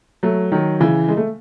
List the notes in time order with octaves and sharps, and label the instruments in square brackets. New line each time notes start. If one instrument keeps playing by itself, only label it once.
[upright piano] F#3 A3
D#3 F#3
C#3 E3
G#3
A3